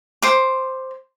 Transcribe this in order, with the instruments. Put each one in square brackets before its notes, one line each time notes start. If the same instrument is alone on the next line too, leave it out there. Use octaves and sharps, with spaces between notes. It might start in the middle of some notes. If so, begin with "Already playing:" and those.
[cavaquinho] C5 D6